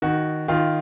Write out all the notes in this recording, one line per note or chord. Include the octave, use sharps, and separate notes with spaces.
D#3 F#4
D#3 F4